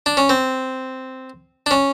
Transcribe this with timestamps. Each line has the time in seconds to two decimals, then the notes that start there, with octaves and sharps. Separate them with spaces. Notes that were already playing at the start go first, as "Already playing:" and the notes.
0.06 D4
0.17 C#4
0.29 C4
1.66 D4
1.71 C#4